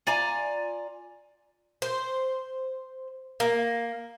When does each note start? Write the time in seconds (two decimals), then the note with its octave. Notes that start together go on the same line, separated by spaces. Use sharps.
0.07 F4 D5 G#5 A#5
1.82 C5
3.40 A#3